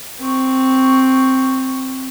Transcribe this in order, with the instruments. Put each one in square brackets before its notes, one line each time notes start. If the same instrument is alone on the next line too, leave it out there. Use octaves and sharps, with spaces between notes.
[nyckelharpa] C4 C#6